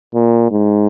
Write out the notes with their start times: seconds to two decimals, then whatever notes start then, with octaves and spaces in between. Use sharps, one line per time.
0.14 A#2
0.51 G#2